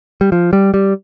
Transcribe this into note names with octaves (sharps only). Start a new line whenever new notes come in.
G3
F3
G3
G3